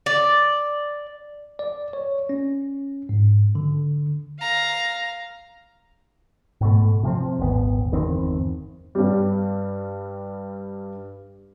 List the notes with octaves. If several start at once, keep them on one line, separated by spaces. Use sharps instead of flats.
D5
D5
C#5
C#4
G#2
D3
F5 A#5
G#2 B2 A3
C3 F3 C4
D#1 G#1 B3
G1 E2 D#3 C4
G2 G3